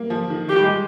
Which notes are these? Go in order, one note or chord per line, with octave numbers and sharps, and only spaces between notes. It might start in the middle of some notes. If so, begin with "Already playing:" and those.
Already playing: A#3
F3
D#3
D#3 G4
G3
G#3